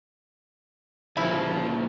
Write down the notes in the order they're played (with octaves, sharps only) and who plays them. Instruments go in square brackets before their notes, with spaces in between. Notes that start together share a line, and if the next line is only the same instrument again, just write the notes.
[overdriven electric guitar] D2 A#2 [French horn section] C#3 F3 [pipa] E4